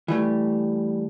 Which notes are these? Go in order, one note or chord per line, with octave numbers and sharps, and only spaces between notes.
E3 G3 A3